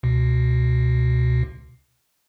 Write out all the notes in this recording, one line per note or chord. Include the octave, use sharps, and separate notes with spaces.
C#2 B2